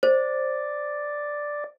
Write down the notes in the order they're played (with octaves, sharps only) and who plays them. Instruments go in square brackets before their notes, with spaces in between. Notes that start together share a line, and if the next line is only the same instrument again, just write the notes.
[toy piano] C5 [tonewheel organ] D5